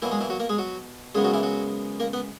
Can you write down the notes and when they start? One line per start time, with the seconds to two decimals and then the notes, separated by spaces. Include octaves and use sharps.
0.02 B2 E3 F#3 A#3 E4
0.11 G#3 G#4
0.21 E3 E4
0.30 F#3 F#4
0.40 A#3 A#4
0.49 G#3 G#4
0.58 F#3 F#4
1.15 F#2 C#3 G#3 B3 G#4
1.24 F#3 F#4
1.34 E3 E4
1.43 F#3 F#4
2.00 A#3 A#4
2.13 B3 B4